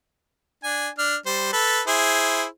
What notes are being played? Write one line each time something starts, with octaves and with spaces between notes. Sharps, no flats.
D4 G#5
D4 F6
G3 C5
A4 B4
E4 G#4 C5